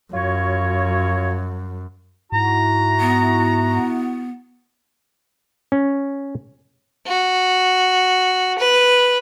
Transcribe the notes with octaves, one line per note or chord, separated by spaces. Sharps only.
F#2 F4 F#4 C#5
G#2 E4 F#4 A#5
B3
C#4
F#4
B4